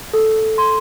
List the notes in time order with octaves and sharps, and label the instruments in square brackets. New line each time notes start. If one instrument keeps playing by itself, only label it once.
[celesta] A4
C6